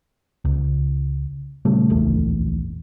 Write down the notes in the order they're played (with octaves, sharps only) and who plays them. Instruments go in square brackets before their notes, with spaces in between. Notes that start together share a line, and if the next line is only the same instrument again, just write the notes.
[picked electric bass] C#2
A#2 C#3 G3 A3
D1 A#1 E2 A3